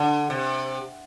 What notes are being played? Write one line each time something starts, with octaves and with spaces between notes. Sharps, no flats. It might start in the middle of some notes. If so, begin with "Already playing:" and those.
Already playing: D3
C3